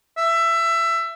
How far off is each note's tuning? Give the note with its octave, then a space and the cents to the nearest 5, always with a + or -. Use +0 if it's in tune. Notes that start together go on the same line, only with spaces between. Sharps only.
E5 +20